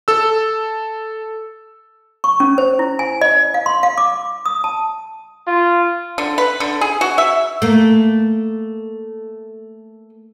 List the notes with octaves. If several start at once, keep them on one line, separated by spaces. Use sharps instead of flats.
A4 E6
C#6
C#4
C5
E4
G#5
D#5
F5
C6
F5
D6
D#6
A5
F4
D3
B4
D3
G#4
F#4
E5
A3 A#3